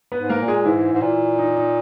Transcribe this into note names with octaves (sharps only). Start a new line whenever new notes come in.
B3 B4
G#2
A#3 A#4
A#2
G#3 G#4
G#2 E3 E4
G#2
A#2
D#4
D#4